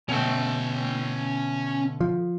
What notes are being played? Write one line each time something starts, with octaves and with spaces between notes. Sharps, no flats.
B2 D3 A3 C#4 G5
F3